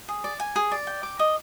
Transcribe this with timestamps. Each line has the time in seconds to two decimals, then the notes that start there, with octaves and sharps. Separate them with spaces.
0.09 G#4
0.24 D5
0.40 G#5
0.56 G#4
0.72 D5
0.87 G5
1.03 D6
1.19 D#5